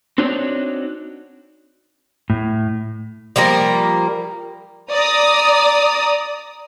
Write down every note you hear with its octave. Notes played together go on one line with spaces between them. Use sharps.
C4 D4 D#4 F#4 C#5 D5
A2
F3 G3 A#3 A#4
D5 A#5 D#6